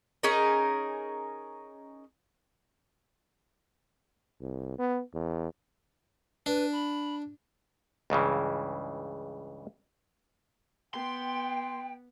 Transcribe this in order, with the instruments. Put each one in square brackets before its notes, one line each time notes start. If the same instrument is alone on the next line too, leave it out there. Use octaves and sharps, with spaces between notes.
[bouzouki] C#4 D#4 G#4 A#4
[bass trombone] C2
B3
E2
[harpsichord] D4 [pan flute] B4
[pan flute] B5
[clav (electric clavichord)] C#2 G2 C#3 E3
[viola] B3 [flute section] G5 [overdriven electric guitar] C6